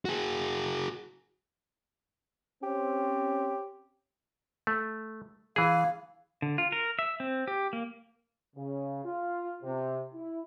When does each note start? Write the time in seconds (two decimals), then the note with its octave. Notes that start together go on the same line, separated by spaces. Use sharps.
0.05 F#4 G#4
2.63 C4 C#4 G4
4.67 A3
5.56 E3 G#4 F5
6.42 D3
6.58 F4
6.72 A#4
6.99 E5
7.20 C4
7.47 G4
7.73 A#3
8.56 C#3
9.04 F4
9.63 C3
10.14 E4